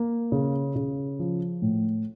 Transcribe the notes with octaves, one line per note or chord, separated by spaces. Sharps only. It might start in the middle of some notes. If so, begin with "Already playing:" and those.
Already playing: A#3
C#3
C#3
F3
A2